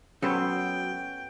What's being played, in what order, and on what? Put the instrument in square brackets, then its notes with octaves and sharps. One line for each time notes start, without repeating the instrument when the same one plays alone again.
[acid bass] F#3 [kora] B3 A4 C5 [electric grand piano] C#4 B5 [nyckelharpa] G5